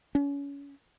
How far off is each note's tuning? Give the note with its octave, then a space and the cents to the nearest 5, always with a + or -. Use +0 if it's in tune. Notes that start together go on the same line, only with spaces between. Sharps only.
C#4 +30